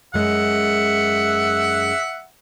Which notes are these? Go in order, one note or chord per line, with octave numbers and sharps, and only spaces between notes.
F#2 G#3 E5 F#5